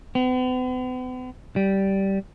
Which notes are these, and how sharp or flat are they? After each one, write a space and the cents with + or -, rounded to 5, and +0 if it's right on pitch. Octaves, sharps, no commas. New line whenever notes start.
B3 +45
G3 -10